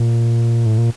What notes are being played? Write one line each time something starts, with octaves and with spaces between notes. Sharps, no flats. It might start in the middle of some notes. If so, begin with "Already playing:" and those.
Already playing: A#2
A2
A#2